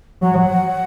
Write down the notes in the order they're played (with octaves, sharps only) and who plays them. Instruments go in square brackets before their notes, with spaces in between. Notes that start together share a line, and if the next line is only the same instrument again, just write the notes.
[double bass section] F#3 [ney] F#5